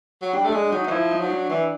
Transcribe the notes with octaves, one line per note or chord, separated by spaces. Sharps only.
F#3
G3 D4
A3
G#3 D4
F#3 D#4
D#4
E3
F3 E4
D#4
F#3
D4
E3 D4